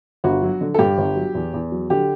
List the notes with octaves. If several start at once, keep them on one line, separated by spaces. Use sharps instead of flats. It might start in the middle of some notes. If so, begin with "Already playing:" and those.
G1 F#4
F#3
D3
A4
G2 G4
G1
F#3
E2
E2
F#3
D3 G4